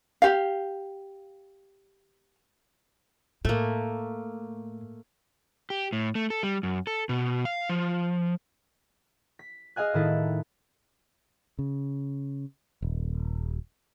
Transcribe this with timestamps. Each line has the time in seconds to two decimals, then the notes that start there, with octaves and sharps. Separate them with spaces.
0.22 G4 F5
3.45 A2 A3 A#3
5.70 G4
5.93 A2
6.15 A3
6.30 A4
6.43 G3
6.63 F#2
6.87 A4
7.09 B2
7.45 F5
7.69 F3
9.39 B6
9.76 G#4 D#5 F5 G#5 F#6
9.94 A2 D#3 E4 A4
11.59 C#3
12.82 D#1